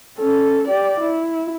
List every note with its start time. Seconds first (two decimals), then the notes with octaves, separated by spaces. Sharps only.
0.18 C#4 A4
0.68 G4 D5
1.01 E4